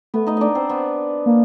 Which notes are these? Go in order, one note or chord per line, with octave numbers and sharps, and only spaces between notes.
A3 B3 B4
D#4 D#5
D4 D5 D#5
C4 C5
B3 B4
A#3